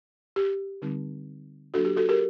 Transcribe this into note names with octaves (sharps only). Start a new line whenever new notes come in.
G4
D3 G3 C4 D#4
F#3 A#3 D4 F#4 A4
G4
F#4 A4
G4 A#4